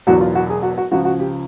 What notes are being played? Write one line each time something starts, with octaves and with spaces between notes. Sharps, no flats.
E1 E2 B2 F#3 F#4
F4
F#4
G#4
F#4
F#4
C#2 C#3 F3 F#4
F#4
G4